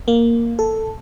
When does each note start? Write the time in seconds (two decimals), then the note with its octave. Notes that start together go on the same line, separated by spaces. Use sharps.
0.08 A#3
0.59 A4